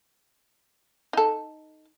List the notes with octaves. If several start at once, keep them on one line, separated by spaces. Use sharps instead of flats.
D#4 A4